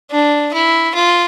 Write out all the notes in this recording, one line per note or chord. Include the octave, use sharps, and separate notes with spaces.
D4
E4
F4